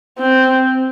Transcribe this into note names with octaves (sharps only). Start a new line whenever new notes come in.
C4